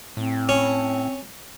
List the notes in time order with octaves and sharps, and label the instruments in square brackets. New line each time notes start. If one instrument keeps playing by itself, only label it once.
[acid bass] A2 [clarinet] C4
[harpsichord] C#4